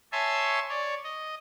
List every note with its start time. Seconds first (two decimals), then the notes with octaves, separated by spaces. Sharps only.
0.12 C#5 E5 G#5 A5 C6
0.69 C#5 D5
1.04 D#5